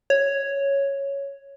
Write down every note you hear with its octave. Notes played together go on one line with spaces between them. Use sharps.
C#5